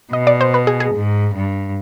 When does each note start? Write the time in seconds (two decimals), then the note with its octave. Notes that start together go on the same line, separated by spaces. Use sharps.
0.13 B2 D#5
0.27 D5
0.41 C5
0.54 B4
0.67 G#4
0.80 G#4
0.94 G#2
1.35 G2